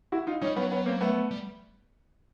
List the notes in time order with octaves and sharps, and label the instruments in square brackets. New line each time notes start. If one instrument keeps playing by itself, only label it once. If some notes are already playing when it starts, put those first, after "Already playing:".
[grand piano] E4 F#4
D#4 F4
[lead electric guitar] G3 [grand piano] C#4 D#4
[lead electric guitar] F#3 [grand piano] B3 C#4
[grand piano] B3 C#4
A#3 C4
A3 B3
[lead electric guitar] G3